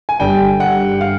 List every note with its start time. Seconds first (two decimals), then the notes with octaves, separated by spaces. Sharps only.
0.09 G#5
0.20 G1 G2 D3 G3 G5
0.60 F#5
1.01 F5